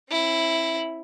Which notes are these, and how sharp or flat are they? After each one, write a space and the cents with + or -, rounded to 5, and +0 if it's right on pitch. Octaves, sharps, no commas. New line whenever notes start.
C4 +45 E4 +0